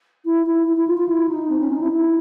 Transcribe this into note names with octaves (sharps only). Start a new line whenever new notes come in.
E4
E4
E4
E4
F4
F4
E4
D#4
C4
C#4
D#4
E4
E4